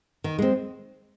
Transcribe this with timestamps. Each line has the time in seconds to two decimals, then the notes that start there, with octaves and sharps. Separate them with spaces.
0.24 D#3
0.38 G#3 C4